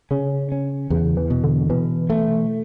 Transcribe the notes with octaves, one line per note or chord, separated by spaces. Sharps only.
C#3 C#4
C#4
E2 C#3
E3
B2
D3
B2 E3
A3